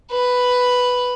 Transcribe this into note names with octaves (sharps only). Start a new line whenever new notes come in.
B4